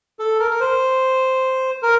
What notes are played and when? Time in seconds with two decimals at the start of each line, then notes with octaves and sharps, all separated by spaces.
0.19 A4
0.40 A#4
0.51 A#4
0.60 C5
1.83 A#4